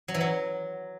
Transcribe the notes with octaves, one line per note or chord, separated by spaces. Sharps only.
F#3
E3
F#3